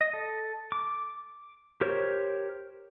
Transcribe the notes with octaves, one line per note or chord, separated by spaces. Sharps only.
D#5
A4
D6
G4 A#4 C5 C#5